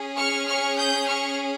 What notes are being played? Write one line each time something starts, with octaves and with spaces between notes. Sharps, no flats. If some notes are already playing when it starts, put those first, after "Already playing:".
Already playing: C#4 G#4
C#6 F6
C#6 F6
D#6 G6
C#6 F6